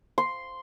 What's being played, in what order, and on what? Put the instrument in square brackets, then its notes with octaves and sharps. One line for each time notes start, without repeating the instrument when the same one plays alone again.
[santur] C6